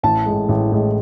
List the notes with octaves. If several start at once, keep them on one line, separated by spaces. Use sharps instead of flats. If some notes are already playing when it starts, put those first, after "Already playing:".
A1 A5
A2 G#3
A1
A2 G#3